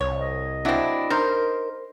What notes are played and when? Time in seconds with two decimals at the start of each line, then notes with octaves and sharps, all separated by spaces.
0.01 C2 C#5
0.20 D#5
0.65 F#3 C4 D4 E4
1.10 D#4 A#4 C5